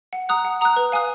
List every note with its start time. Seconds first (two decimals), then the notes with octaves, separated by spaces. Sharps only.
0.13 F#5
0.29 A#5 D#6 F#6
0.45 F#5
0.61 A#5 D#6 F#6
0.76 B4
0.92 F5 G#5 D#6 F#6